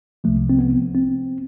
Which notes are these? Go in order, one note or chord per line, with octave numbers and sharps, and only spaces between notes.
C2 C3 F3 A3
C4
B3
C4